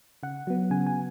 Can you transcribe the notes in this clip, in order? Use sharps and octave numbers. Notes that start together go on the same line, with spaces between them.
C#3 F#5
F#3 B3
C#3 G#5
G#5